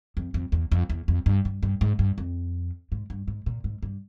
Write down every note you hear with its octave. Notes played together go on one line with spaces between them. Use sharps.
F2
F2
E2
F2
E2
F2
G2
G2
G2
G#2
G2
F2
G#2
G2
G#2
A#2
G#2
G2